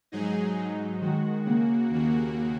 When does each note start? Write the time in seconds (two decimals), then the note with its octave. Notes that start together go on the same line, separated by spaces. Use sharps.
0.12 G#2 F#3 D#4 G#4
0.56 G#2 F#3 D#4
1.01 D#3 G#3 F#4
1.45 C#3 A#3 F#4
1.90 D#2 C#3 A#3 F#4